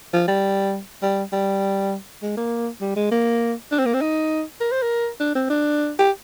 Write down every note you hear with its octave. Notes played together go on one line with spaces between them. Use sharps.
F3
G3
G3
G3
G#3
A#3
G3
G#3
A#3
D4
C4
A#3
C4
D#4
A#4
C5
A#4
D4
C4
D4
G4